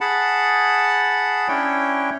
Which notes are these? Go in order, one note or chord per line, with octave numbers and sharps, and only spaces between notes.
G#4 F#5 A5 B5
C#4 D4 E4 C#5 G5